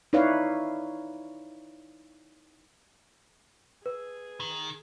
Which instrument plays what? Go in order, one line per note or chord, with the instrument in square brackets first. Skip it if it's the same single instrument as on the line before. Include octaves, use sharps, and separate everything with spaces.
[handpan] D#4 E4 B4 C#5 D5 F5
[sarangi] G#4 [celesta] B4
[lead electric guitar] D#3